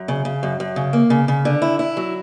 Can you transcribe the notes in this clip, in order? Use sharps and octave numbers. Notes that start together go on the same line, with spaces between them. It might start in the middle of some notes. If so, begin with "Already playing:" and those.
Already playing: F#2
C#3
C#3
F#2
F#2
C#3
A#3
C#3
C#3
D3
E4
E4
F#3